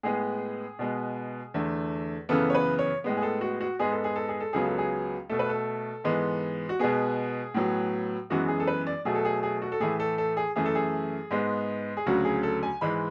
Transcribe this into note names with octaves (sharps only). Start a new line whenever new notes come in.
A2 G#3 B3 G#4
B2 G#3 B3
E2 D3 A3
F#2 C#3 E3 B3 A4
C#5
B4
C#5
A2 G#3 B3
G#4
A4
F#4
F#4
G#2 G#3 B3 G#4
A4
G#4
A4
G#4
A4
C#2 C#3 F#3 B3 G#4
A4
G#4
B2 A3 A4
B4
A4
G#2 E3 G#3 B3
F#4
B2 G#3 B3 G#4
A2 F#3 B3
F#2 E3 G#3 B3 F#4
G#4
A4
B4
D5
B2 F#3 A3 G#4
A4
G#4
G#4
F#4
A4
A2 E3 A3 G#4
A4
A4
G#4
F#2 E3 A3 G#4
A4
G#4
G#2 G#3 B3
G#4
D2 C#3 F#3 F#4
G#4
A4
G#5
G#2 E3 G#3 B5